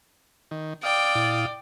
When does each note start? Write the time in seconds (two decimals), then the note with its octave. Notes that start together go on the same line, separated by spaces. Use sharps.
0.51 D#3
0.83 D5 F5 G5 D#6
1.15 A#2 E4